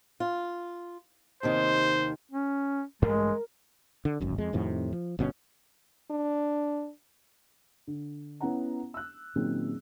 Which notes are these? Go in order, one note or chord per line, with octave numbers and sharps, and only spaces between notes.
F4
D#2 C3 D#3 C5
C#4
A1 G2 G#3 A3 A#4
D3
D1 G#1 F#2
F2 G#3
F2 A2 C3 D#3
F3
G1 B2 C4 C#4
D4
D3
B3 C#4 E4 C#5 F#5 A#5
E6 F#6
A#2 D#3 F#3 C4 C#4 G#4